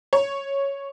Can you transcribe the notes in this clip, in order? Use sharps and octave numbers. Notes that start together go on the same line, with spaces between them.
C#5